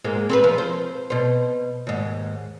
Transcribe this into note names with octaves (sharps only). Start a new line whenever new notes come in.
G#2 G#3 A#3
C4 A4 B4
F3
C5
B2 C5
D#2 G#2